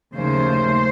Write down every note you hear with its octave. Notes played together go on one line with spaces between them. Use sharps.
D#2 C#3 F3 A3 C5